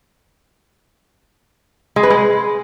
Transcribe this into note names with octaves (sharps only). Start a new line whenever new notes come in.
G#3
B4
G#3